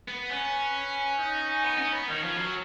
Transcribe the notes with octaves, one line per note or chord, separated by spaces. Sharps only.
B3
C#4 B4
D#4
B3
C#4
B3
D#3 C#4
F3
F#3